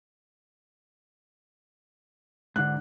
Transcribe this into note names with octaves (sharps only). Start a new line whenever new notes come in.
G#2 D3 F#5 F#6